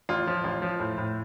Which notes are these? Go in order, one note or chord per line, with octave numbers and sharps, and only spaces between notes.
A1 F4
F3
A1
F3
A2
A2